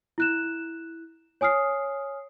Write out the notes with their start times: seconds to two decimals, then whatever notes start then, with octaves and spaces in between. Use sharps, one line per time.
0.18 E4 F#6 E7
1.41 C#5 G#5 D#6 F6 C7